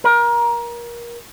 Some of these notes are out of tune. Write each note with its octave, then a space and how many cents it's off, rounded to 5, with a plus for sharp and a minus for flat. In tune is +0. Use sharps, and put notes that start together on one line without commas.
A#4 +25